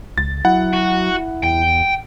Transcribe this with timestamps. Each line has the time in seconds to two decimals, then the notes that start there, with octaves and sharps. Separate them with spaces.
0.18 C#2 A6
0.45 F#3 E4 F#5
0.73 F#4
1.43 E2 G5